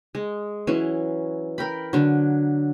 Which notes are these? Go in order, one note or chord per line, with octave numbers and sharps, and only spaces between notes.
G#3
E3 F#3 C#4
A#4 G5 B5
D3 F#3